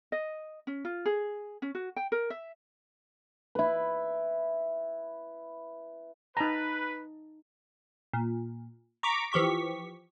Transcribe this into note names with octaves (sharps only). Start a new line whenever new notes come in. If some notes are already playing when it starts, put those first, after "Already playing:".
D#5
C#4
F4
G#4
C#4
F#4
G5
A#4
E5
E4 B4
D#4 B4 A5 A#5
A#2
A#5 C#6 D6 B6 D7
E3 F3 G4 C#6 B6